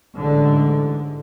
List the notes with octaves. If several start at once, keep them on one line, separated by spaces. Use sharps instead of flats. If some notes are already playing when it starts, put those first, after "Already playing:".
A1 G#2 D3